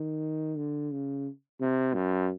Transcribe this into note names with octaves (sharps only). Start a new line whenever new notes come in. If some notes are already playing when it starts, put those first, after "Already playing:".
Already playing: D#3
D3
C#3
C3
F#2